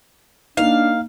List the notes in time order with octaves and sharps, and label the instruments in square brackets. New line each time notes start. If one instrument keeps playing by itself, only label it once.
[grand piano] A#3 D#4 [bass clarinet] D4 [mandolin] F5